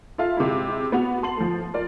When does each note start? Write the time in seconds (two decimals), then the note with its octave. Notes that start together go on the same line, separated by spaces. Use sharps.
0.18 F4 A4 E5 F5
0.37 C3 G#3 E4
0.92 B3 F#4 F7
1.23 A5 C6 C7 F#7
1.37 F3 A3
1.74 F4 A#4 D5